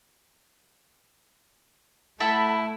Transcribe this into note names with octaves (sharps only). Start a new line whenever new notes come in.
A3 E4 A4 F#5 A5 B5